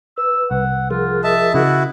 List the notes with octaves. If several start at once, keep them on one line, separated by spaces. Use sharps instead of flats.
B4 E6
C2 F#5
F3 F4 G#4 A#4
D#5 E5 A5
C#3 E4 F#4